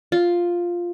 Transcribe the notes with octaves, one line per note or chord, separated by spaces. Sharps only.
F4